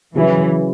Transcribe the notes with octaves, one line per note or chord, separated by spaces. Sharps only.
C#3 E3 F#3 C#4